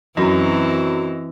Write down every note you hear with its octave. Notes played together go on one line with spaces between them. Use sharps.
F#2 E3 C4 D#5